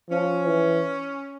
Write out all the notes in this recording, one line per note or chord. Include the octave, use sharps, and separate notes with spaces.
F3 C#4
E3